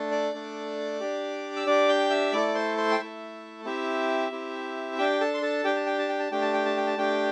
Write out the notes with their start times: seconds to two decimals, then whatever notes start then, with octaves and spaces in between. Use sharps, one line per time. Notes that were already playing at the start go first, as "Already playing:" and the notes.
Already playing: A3 D4 A4
0.11 D5 D6
0.34 A3 D4 A4
1.00 D4 G4
1.56 E6
1.66 D4 G4 D5 D6
1.88 G5 G6
2.10 E5 E6
2.32 A3 E4 A4 D5 D6
2.48 D6
2.54 C5 C6
2.77 C5 C6
2.91 G5
2.98 A3 E4 A4 E5
3.65 C4 E4 G4 E5
4.31 C4 E4 G4
4.98 D4 G4 G5
5.21 A4 A5
5.34 C6
5.42 A4 A5
5.64 D4 G4 G5
5.76 A5
5.86 G5
5.99 A5
6.09 G5
6.20 A5
6.31 A3 D4 G4 G5
6.42 A5
6.53 G5
6.66 A5
6.77 G5
6.87 A5
6.97 A3 D4 G4 G5